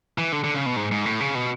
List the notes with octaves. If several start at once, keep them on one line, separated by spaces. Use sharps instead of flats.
E3
D3
D3
C#3
B2
G#2
G#2
A2
C#3
B2